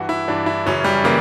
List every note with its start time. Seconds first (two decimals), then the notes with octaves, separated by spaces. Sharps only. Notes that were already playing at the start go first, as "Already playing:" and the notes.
Already playing: G2 E3 F#4
0.09 E4
0.28 G2 E3 D4
0.46 E4
0.66 F#2 C#3 E3 C#4
0.84 G3
1.04 C#3 E3 A#3